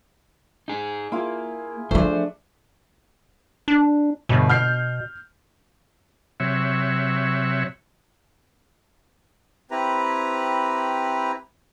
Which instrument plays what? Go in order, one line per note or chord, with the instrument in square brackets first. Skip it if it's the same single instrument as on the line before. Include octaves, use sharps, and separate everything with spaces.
[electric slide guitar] D#4 G#4
[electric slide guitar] A#3 [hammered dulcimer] E4 F4 G#4
[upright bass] E3 F3 [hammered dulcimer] A3 D4 [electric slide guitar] C5
[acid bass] D4
[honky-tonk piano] G1 [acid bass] B2
[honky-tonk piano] F6 G6 C7
[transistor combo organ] C3 F#3 C#5 E5
[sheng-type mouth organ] C4 E4 G4 B4 A#5